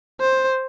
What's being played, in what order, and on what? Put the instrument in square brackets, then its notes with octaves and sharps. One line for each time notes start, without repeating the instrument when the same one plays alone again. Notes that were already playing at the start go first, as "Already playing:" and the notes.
[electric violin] C5